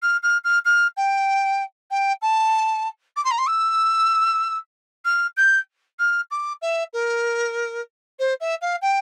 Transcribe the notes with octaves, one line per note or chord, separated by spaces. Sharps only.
F6
F6
F6
F6
G5
G5
A5
D6
C6
A#5
C6
E6
F6
G6
F6
D6
E5
A#4
C5
E5
F5
G5